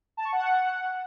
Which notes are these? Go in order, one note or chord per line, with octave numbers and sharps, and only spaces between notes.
A5
C#6
F#5